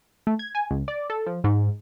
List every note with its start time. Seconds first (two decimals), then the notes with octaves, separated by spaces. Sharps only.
0.27 A3
0.39 G#6
0.55 G#5
0.71 C#2
0.88 D5
1.10 A4
1.27 F3
1.44 G#2